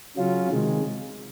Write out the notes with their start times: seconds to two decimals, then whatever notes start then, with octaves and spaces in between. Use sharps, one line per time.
0.17 C#3 F#3 C#4 F4
0.48 C3 D#3 G#3